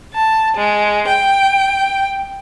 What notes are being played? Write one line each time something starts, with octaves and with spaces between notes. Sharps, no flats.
A5
G#3
G5